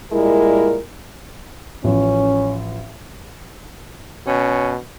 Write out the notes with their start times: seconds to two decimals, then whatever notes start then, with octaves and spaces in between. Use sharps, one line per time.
0.12 A#2 G3 G#3 E4 A#4
1.84 A1 F3 C#4
4.26 B2 C#4